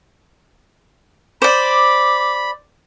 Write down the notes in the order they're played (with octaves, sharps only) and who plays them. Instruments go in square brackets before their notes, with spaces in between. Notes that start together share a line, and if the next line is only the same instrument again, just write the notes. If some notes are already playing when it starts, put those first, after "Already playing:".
[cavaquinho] C5 D5 [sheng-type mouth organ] B5 [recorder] D6